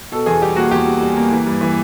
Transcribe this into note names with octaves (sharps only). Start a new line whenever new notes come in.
B2 A4
E2 G#4
G3 G4
A#3 F#4
E2 G4
G3
G3
A#3
E3
G2
E3